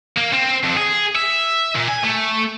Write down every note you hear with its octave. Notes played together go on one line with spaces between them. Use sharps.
A#3
C4
F2
G#4
E5
A#2
G#5
A3